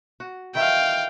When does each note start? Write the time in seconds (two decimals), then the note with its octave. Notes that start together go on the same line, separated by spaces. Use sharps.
0.20 F#4
0.55 D#3 E3 E4 F5 G5